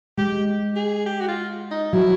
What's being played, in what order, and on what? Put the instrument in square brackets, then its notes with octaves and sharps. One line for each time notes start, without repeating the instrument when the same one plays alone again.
[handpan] G#3 [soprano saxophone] G4
[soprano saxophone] G#4
G4
F#4
F4
D#4
[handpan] F#3 [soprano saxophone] E4